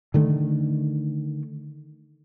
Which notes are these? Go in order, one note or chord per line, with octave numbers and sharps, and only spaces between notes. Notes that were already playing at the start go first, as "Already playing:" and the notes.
D3 D#3 A3